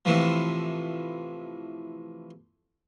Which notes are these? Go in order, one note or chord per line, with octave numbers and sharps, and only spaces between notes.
A2 C3 E3 F3